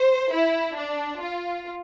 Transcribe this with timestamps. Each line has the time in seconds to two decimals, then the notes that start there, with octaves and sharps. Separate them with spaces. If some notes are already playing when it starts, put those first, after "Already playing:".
Already playing: C5
0.32 E4
0.77 D4
1.21 F4